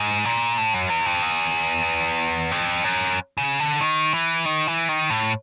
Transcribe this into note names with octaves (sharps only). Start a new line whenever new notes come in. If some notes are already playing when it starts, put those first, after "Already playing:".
Already playing: G#2
A#2
A2
F#2
E2
F2
E2
F2
F#2
C#3
D3
D#3
E3
D#3
E3
D#3
A2